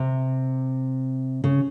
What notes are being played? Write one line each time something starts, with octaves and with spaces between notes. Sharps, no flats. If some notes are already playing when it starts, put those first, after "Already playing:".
Already playing: C3
C#3